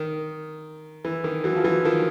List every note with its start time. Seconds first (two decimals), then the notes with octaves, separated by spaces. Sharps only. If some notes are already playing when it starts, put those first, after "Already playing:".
Already playing: D#3
1.05 E3
1.24 D#3
1.44 E3 F#3
1.56 F3
1.64 E3 F#3
1.85 D#3 F3